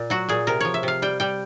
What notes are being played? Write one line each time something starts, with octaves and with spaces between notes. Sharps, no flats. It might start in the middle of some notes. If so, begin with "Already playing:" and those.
Already playing: A#2
F#3 F#4
A#2 G#4
C3 A#4
F3 C#5
E5
C3 F5
G3 G5
G3 G5